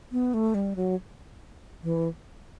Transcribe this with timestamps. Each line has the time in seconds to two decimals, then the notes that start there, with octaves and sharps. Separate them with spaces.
0.12 B3
0.34 A3
0.54 G3
0.76 F#3
1.83 E3